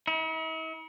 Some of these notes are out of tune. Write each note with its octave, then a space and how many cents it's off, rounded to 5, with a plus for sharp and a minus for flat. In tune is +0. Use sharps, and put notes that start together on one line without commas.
E4 -45